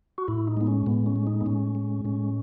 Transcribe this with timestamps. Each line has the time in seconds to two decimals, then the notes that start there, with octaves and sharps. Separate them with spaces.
0.18 F#4
0.28 A2 E4
0.47 D#4
0.57 G#3 B3
0.67 C#4
0.86 A2 B3
1.06 C#4
1.16 G#3
1.27 D#4
1.41 B3
1.46 A2 C#4
1.75 G#3
2.05 A2 C#4